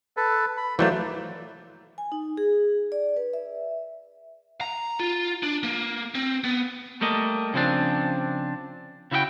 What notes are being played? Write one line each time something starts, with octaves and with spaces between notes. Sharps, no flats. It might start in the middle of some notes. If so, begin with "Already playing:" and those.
A4 B4
B5
E3 F#3 A3 A#3 C5 D5
G#5
D#4
G#4
D5
B4
E5
A#5
F4
D4
A#3
C4
B3
G3 A3 A#3 D#5
C#3 F3 C4 D4
C#3 E4 F#4 D#5 G5